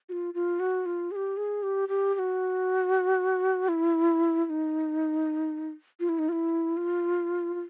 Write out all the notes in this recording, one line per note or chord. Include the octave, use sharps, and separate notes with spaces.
F#4
F4
F4
F#4
F4
G#4
G4
G#4
G4
G4
G4
F#4
E4
E4
D#4
F4
E4
D#4
F4
E4
F4
F4